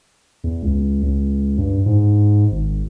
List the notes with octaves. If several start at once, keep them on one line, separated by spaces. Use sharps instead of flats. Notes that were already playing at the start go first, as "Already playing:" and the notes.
E2
C#2
C#2
G2
G#2
G#1